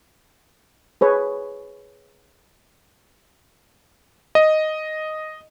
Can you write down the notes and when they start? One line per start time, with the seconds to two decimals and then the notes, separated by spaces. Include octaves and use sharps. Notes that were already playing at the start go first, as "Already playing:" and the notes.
1.01 G#4 B4 C#5
4.35 D#5